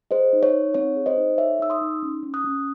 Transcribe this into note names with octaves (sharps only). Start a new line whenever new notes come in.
G#4 C5 D#5
D#4
C#5
D#4
C4 C#5
G#4
C5 D#5
D#4
A4 C#5 E5
D#4 E6
C6 D#6
D#4
C#4
C#4
D#6 F#6
C#4